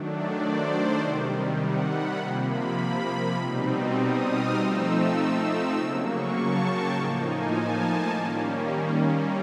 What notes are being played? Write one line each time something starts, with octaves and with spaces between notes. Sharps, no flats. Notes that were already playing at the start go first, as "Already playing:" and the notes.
Already playing: D#3 F#3 A3 D4
D5
C5
C3 D#3 G3
F#5
B5
C3 F3 A#3 C6
B5
B2 G3 C4 D#4
D#6
F6
F3 A3 C4 D#4 E6
C#3 F#3 A#3 E6
C#6
A5
G5
A2 F3 A#3 D#4 G#5
G#5
A5
D#3 G3 A#3 C#4